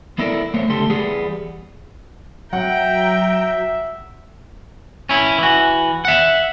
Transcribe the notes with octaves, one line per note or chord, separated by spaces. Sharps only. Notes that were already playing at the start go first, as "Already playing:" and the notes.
E3 B3 E4 A4 A#4 D5
A3 B3 C5 C#5
C#2 D3 A3 G4 A4 C6
E3 G3 B3 G#4
F#3 E5 F#5 G5 A#5
C#4 E4
E3 F#4
E5 F#5